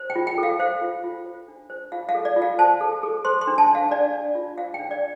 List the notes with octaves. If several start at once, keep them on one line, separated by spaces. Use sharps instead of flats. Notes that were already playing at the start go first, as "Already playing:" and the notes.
Already playing: C5
G5
F4
G5
A4
F5
C5 F5
F4
F4
C5
D4
C5
F4 F5
F5
A4
D5
F4
F5
C5 A5
A4
A4
C5 C6
C6
D4
A5
D4
F5
D4 D5
D4
F4
C5 F5
G5
D4
D5